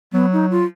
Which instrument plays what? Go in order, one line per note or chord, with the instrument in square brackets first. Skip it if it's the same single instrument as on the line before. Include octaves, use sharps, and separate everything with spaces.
[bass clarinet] F#3 [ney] B3
[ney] D#4
F4